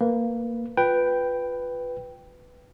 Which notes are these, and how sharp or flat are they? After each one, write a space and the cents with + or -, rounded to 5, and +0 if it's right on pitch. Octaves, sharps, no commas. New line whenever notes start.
A#3 -10 B4 +0
F4 +20 B4 +5 G5 +0